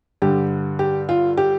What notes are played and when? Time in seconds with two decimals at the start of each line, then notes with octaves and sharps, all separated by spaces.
0.22 G2 D3 G4
0.79 G4
1.09 F4
1.37 G4